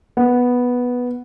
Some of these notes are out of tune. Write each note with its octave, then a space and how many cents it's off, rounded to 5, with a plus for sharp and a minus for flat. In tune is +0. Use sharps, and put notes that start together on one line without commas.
B3 -5